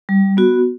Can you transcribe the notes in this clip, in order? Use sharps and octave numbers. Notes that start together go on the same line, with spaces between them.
G3
B3 F#4